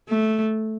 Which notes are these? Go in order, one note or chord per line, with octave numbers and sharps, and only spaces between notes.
A3